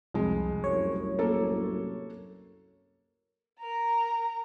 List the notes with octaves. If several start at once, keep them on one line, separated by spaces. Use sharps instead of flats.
C2 F2 G#3
C2 F#2 A2 C#5
A#3 A4
A#4 A#5